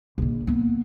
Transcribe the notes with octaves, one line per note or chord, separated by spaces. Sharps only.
A#1 D3
A#3 B3